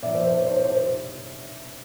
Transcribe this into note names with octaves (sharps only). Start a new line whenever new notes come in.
A#2 F3 D5 E5
C5 D5
C5
C#5
C5
C#5
C5
C5